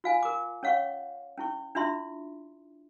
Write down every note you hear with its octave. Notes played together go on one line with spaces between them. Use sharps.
F4 F5 G#5
A#4 D6
C#4 C#5 F5 F#5 C#6
C#4 E4 C#6
D4 E4 F4 E5 C6